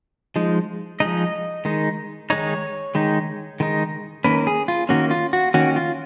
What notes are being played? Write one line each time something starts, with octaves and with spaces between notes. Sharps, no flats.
F3 G#3 D#4
F3 G#3 D#4 D#5
D#3 G#3 D#4
D#3 G#3 D#4 C#5
D#3 G#3 D#4
D#3 G#3 D#4
D#3 A#3 C#4 B4
G#4
F4
D#3 A#3 C#4 F#4
F4
F#4
D#3 A#3 C#4 F#4
F4